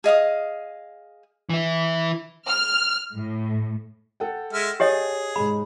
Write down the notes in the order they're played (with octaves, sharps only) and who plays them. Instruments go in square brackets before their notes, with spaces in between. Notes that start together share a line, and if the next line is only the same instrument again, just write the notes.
[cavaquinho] G#4 D#5 F5 D#6
[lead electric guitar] E3 E4
[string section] F6
A2
[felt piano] A4 F#5 G5
[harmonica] G#3 E5 F6
[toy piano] G4 C#5 D#5 [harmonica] G#4
[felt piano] G#2 G#3 [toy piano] B5